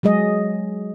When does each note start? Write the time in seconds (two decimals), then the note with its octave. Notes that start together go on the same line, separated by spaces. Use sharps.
0.03 F#3 G#3 G#4 D#5